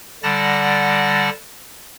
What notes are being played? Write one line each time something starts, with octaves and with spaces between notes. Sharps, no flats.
D3 G3 D5 F#5 A5 A#6